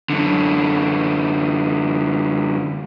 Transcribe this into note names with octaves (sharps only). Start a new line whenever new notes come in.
F#2 D3